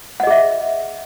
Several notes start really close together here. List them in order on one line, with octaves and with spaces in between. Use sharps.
F#5 D#5 G#4 E5